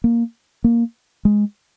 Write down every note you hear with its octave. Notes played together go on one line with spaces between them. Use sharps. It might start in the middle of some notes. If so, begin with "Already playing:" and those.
A#3
A#3
G#3